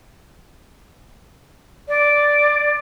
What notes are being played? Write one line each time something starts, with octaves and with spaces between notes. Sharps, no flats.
D5